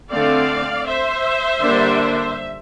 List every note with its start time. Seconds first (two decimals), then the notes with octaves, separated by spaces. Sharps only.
0.10 D3 A3 C4 D5 F5
0.86 C5 E5
1.61 D3 G3 A#3 D4